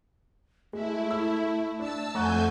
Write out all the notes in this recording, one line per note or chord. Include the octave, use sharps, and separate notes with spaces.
G#3 A3 E4
E6
D4 A5 E6
F2 A3 F#5 G#5 A#5 C#6 F#6 G6